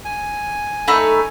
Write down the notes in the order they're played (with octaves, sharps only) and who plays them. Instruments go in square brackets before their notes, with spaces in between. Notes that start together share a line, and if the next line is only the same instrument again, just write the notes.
[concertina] G#5
[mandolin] A3 D#4 B5 [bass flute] A4